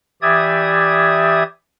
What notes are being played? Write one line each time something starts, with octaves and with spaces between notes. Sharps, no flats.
E3 G4 D5 E5 D#6 G#6